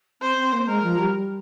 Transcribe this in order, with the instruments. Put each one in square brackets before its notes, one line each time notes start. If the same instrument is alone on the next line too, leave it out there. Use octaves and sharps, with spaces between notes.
[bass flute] C4 [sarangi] C5
[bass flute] C4
A#3
[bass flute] G#3 [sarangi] A#4
[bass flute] F3
G3